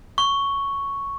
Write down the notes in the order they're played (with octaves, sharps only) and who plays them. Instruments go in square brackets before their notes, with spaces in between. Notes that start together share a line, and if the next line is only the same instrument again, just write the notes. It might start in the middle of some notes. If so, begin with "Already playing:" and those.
[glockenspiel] C#6